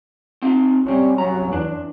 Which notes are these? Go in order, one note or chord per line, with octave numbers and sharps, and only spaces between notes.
C4 D#4 F4
B2 G3 C4 C#4 G4
C2 F2 F#3 C#4 A#5
E2 D4